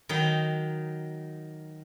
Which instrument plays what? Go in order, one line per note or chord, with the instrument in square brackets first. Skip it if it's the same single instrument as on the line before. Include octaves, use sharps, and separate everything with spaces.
[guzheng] D#3 F#3 D#4